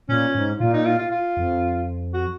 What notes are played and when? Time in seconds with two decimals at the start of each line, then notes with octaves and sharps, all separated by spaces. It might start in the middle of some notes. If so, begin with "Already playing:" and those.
0.09 A#2 C#4
0.35 G#2
0.60 A#2 F4
0.74 D#4
0.86 F4
0.99 F4
1.11 F4
1.37 F2
2.14 F#4